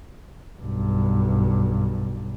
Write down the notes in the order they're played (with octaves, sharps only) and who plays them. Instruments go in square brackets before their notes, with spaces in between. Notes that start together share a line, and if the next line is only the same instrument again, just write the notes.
[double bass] B1 G2